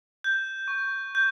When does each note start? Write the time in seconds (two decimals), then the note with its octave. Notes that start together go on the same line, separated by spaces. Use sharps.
0.24 G6
0.68 C#6
1.15 G6